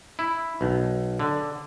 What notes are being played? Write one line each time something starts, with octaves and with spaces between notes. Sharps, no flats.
E4
B1
D3